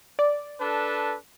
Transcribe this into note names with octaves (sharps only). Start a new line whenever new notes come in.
D5
D4 A4 B4